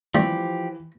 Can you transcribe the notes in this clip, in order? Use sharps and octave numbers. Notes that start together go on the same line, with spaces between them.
E3 F3 G3 A3 C4 G4